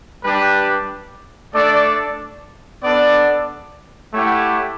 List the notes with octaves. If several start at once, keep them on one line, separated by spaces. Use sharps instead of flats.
G3 D4 G4 B4
A3 D4 A4 D5
B3 D4 A4 D5
A3 E4 G4 C#5 F#5